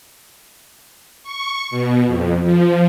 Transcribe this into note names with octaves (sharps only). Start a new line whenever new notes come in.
C#6
B2
F2
F3